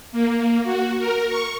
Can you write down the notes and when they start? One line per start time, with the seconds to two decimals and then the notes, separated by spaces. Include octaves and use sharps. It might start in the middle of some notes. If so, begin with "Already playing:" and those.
0.12 A#3
0.64 F#4
0.98 A#4
1.28 C#6